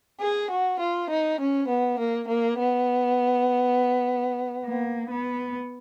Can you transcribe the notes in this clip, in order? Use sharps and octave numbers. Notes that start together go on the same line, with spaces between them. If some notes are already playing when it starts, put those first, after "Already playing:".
G#4
F#4
F4
D#4
C#4
B3
A#3
A#3
B3
A#3
B3